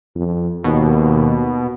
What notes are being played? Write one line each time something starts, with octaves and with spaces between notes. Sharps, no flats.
F2
D#2 B2